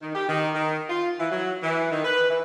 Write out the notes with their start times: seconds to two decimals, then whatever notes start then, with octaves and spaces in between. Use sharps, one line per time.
0.02 D#3
0.15 G4
0.29 D#3
0.54 D#3
0.89 F4
1.19 E3
1.32 F#3
1.63 E3
1.91 D#3
2.04 B4
2.29 E3